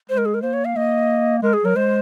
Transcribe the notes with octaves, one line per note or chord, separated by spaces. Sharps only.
G#3 C5
A#4
G#4
A#4
A#3 C5
C#5
F5
A#3 D#5
G#3 A#4
G#4
F#3 A#4
G#3 C5